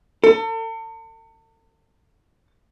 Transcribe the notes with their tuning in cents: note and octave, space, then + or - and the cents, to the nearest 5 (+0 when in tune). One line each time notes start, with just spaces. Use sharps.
A4 +40